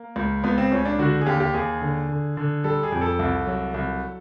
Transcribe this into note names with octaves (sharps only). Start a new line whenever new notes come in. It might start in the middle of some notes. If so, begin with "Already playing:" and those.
Already playing: A#3
C#2
C#2 B3
C4
C#2 C#4
D4
D3 F#4
G#4
D#2 G4
G4
D#2 G#4
D3
D3
D3
G3 A4
G#4
F2
A4
C2
F#3
C2